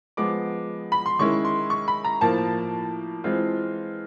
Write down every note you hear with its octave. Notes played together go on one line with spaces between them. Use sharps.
F3 G#3 B3 D6
B5
C6
D#3 G#3 C#4 E4 C#6
C6
C#6
B5
A#5
A2 F3 A#3 A5
E3 G#3 C4 F4